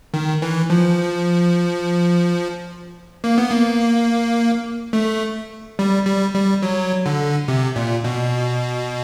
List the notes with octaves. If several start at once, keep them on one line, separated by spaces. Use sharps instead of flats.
D#3
E3
F3
A#3
B3
A#3
A3
G3
G3
G3
F#3
D3
C3
A#2
B2